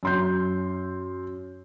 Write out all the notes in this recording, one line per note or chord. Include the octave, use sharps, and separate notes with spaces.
F#2 C6 G6